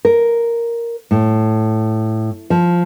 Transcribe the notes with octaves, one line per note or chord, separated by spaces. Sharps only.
A#4
A2
F3